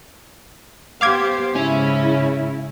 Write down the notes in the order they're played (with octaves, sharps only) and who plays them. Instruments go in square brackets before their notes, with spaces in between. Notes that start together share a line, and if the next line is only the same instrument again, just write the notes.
[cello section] B3 G4 C5 [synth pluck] F5 D6 G#6
[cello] G#2 C#3 [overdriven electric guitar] C#4 [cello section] E4